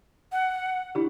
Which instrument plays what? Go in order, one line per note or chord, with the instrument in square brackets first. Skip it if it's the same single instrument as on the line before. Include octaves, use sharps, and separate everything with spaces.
[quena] F#5
[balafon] D4 E4 G4